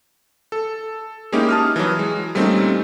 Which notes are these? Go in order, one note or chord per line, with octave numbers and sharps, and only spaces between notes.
A4
G#3 A#3 C#4 D#4 E4 G4
A5 D#6 F6
E3 F#3
G#3
A#2 G3 A3 C4 C#4 D#4